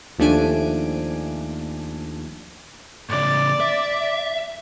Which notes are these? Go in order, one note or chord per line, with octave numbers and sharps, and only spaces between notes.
D#2 F3 A3 D4 G#5 D7
A2 C#3 D5
E5